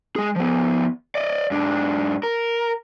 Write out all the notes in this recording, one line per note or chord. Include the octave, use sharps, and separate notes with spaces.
G#3 G#4
F3 B3
D5 D#5
G#2 D4
A#4